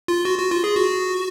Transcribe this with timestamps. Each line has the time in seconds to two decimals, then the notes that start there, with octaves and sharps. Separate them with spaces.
0.08 F4
0.25 F#4
0.39 F#4
0.51 F4
0.64 G#4
0.76 F#4